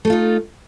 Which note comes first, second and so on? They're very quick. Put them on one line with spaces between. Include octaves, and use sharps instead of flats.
A3 A4 F4 D#4